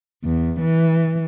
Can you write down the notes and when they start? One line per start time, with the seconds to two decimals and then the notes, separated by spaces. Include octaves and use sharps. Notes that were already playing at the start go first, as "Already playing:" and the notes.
0.25 E2
0.61 E3